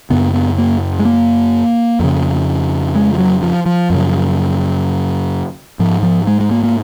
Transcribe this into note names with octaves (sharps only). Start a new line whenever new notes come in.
F#2 C#3 B3
B3
A#3
G#3
A#3
F2 C#3
G#3
F3
F#3
F3
F3
F#2 C#3
G#2 F3
F3
G#3
G#3
A#3
A#3